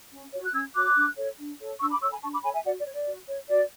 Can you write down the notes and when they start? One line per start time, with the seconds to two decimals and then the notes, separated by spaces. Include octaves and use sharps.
0.12 C#4
0.33 F#4 C#5
0.45 F#6
0.54 C#4 E6 G#6
0.74 F#4 C#5 D6 F#6
0.96 D4
1.17 A4 C#5
1.38 D4
1.60 A4 C#5
1.80 D4 C#6 E6
1.91 B5 D6
2.01 A4 C#5 C#6 E6
2.12 G#5 B5
2.22 D4 A5 C#6
2.33 B5 D6
2.43 A4 C#5 G#5 B5
2.54 E5 G#5
2.65 F#4 D5 F#5
2.79 D5
2.86 C#5
2.93 D5
3.07 F#4
3.28 C#5
3.49 F#4 D5